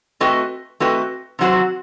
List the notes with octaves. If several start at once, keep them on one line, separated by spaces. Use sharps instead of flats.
A3 C4 F#4 B4 D#5
A3 C4 F#4 B4 D#5
C3 F#3 C4 F#4 C5